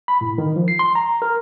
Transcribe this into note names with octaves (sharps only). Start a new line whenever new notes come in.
B5
A2
D#3
F3
C7
C6
A#5
A#4